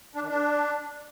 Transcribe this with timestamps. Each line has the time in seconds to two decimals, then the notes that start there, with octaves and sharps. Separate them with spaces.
0.15 D4
0.22 D#3
0.29 D4